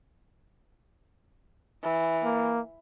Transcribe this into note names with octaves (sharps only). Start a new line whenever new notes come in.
E3
A#3